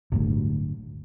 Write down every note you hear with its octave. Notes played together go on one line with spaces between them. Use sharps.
D1 G1 D2